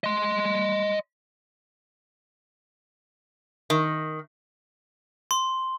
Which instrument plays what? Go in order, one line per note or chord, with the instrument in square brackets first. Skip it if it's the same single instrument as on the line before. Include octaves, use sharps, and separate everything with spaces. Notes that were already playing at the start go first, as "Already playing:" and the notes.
[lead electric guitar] D#5 C6
[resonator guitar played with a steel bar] D#3
[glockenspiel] C6